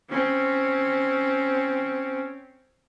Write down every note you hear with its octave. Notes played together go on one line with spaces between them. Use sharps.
C4 C#4